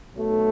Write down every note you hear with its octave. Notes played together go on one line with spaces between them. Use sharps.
B1 B2 F#3 A3